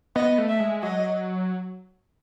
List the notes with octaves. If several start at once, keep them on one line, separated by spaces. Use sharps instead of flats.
B3 D#5
A3
E5
G#3
F#3 D#5